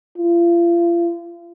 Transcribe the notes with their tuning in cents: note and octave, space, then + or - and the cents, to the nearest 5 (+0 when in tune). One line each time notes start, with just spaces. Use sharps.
F4 -35